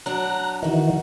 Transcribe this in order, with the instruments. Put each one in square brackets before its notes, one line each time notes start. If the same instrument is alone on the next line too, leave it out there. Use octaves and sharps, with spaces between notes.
[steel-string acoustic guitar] F#3 D4 [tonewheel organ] A#5 F#6
[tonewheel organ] D#3 E3 [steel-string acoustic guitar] D#4 F#4